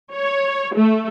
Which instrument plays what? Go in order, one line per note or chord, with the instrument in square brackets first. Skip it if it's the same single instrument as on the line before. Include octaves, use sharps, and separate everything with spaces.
[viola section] C#5
A3